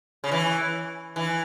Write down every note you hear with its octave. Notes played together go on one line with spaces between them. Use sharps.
C#3
E3
E3